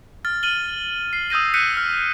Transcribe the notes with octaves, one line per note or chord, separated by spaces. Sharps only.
F6 A6
F6 D#7 F#7 G7
C7
D#6 E6 G6 A#6 D#7
F#6 G6 B6 C#7 D#7
F6